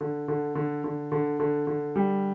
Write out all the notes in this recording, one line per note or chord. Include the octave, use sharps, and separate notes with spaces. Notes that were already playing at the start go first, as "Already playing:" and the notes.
D3
D3
D3
D3
D3
D3
D3
G3